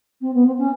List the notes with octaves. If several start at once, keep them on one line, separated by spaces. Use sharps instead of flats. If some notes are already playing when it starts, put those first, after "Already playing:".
C4
B3
C4
C#4